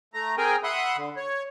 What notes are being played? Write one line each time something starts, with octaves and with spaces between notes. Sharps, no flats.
A3 A#5
C4 G#4 A#4 G5 G#5 A#5
E5 F#5 B5 C6 D#6 F#6
D3
C#5